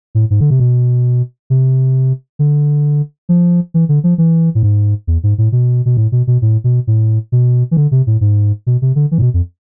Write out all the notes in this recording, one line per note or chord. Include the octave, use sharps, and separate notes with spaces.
A2
G#2
D3
C3
B2
C3
D3
F3
E3
D3
F3
E3
A2
G#2
E2
G#2
A2
B2
B2
A2
B2
B2
A2
B2
A2
B2
E3
D3
C3
A2
G#2
B2
C3
D3
E3
A2
B2
F2